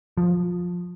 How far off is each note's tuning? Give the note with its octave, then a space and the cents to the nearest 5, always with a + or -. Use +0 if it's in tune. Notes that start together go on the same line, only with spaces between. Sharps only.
F3 +15